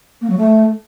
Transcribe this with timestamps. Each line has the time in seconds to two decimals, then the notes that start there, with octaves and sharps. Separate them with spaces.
0.21 A#3
0.29 F#3
0.38 A3